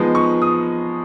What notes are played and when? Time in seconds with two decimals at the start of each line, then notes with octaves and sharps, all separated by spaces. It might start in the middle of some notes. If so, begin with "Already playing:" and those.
Already playing: F3 G#3 B3 D#4
0.15 C#6
0.42 D#6